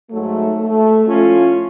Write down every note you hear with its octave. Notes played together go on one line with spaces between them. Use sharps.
G#2 F#3 A3
A3
A2 F3 C#4 F4